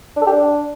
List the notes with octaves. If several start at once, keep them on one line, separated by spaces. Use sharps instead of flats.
D4
A4
G4
D4